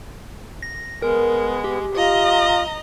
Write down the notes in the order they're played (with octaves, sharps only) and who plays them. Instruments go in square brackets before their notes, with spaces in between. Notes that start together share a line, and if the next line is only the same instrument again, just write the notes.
[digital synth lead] A#6
[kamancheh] G#3 [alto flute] B3 [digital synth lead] A#4
[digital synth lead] G4
[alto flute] F4 [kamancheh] D#5 A#5